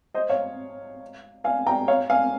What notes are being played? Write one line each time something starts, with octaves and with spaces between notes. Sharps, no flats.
C5 D#5
C#5 F5
F5 G#5
G5 A#5
C#5 F5
F5 G#5